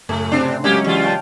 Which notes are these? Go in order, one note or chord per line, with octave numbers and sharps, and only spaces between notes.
F#2 A2 C#3 A3
C3 C4 D4
F#3 G#3 A#3 C#4 E4 G4
E2 F4
F5 G5 A5